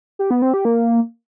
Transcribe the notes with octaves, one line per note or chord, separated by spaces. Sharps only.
G4
B3
C4
G4
A#3